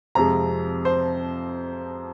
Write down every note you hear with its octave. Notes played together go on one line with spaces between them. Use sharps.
F2 C3 F3 G#3 A#5
C5